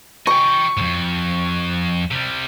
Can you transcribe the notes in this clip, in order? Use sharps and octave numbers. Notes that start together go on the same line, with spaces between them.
D#5 G5 C#6
F2 G#2
C3 G3